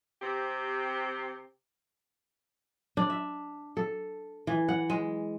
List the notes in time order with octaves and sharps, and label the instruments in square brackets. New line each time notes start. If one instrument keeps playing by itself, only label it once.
[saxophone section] C3 C4 G4
[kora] D4
E5
A4
E3
F#5
G#3